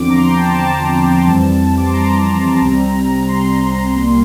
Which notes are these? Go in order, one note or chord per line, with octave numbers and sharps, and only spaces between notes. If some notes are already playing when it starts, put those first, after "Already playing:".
Already playing: E2 D3 F3 C4 D6
A#5
C6
G5
A5
A5
A#5
A5
F2 E3 G3 C4
D6
C6
A#5
C2 C3 G3 C4
C6
C2 A#2 G3 A#3